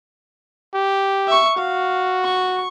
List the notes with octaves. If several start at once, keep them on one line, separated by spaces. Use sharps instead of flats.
G4
E5 C#6
F#4 F5
C#6